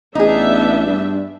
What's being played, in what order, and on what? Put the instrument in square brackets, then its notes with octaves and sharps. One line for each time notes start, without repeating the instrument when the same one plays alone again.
[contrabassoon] A1 [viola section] B3 D4 E5 [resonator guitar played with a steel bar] D#4 G#4
[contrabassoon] G2